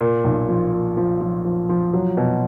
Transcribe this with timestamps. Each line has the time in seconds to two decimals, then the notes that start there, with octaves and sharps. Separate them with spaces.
0.01 A#2
0.24 B1
0.49 F3
0.73 A#2
0.97 F3
1.21 F3
1.45 F3
1.69 F3
1.93 F#3
2.17 B2